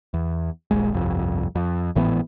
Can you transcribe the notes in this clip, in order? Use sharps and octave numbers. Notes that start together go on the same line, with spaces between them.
E2
D#1 A#1 G#3
G1 C2 F2
F2
G#1 A2 E3 B3